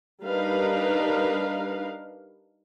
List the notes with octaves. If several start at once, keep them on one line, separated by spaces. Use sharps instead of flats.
G3 D4 D#4 A#4 B4 F5